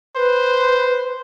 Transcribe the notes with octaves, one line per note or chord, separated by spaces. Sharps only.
B4 C5